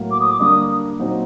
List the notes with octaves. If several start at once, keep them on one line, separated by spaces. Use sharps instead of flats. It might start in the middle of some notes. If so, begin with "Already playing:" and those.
Already playing: A2 F#3 A#3
D6
D#6
D6
D3 G3 A#3 D4 D#6
A#2 F#3 C4 D#4